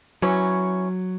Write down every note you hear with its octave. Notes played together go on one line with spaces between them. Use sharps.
E3 F#3 C#4